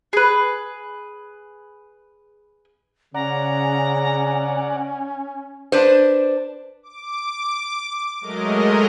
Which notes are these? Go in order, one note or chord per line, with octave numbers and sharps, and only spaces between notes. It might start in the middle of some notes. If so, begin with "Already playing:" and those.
G#4 B4
C#3 C#4 D5 F#5 A#5
D4 B4 C5
D6
F#3 G#3 A3 A#4 D#5